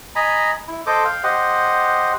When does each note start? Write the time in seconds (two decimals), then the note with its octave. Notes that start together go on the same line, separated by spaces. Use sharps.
0.16 D#5 G#5 A#5 B5
0.68 E4
0.86 A4 C5 D#5 D6
1.05 F5 G5
1.23 G4 C5 D#5 F#5